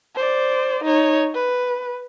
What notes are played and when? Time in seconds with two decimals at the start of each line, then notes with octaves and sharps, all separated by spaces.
0.15 C5 D5
0.84 D#4 C#5
1.34 B4